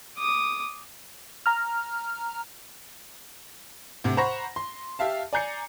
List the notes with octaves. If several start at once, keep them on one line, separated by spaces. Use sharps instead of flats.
D6 D#6
A#5 F6
D2 C3
C5 F#5 A#5 B5 C#6 A#6
C6
G4 E5 F5 A5
D5 G#5 A#5 G6 C7 C#7